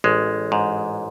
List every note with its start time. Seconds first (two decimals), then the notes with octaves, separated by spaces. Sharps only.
0.04 A1 G#3
0.52 G#2